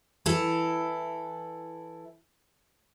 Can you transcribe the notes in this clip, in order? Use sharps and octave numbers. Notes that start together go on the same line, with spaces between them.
E3 E4 A4